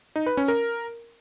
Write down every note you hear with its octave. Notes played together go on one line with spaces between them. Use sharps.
D#4
B4
C#4
A#4